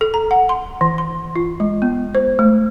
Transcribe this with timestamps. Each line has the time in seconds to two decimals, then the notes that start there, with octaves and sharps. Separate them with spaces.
0.01 A4
0.14 A#5
0.31 F#5
0.49 C6
0.81 E3
0.98 C6
1.36 F4
1.60 G#3
1.82 B3
2.15 C5
2.39 A3